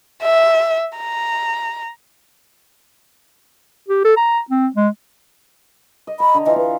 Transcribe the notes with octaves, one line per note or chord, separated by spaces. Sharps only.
E5
A#5
G4
A4
A#5
C4
G#3
D#5
A#5 B5
D3
E3 F4 D#5
B4